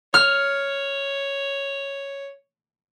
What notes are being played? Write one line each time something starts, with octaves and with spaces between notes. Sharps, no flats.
C#5 F6